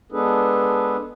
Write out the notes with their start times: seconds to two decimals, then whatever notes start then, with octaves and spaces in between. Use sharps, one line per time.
0.12 G#3 B3 D4 G#4 A4 B4